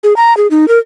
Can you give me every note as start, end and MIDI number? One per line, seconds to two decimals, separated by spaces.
0.03 0.16 68
0.16 0.36 82
0.37 0.47 68
0.51 0.68 63
0.68 0.79 70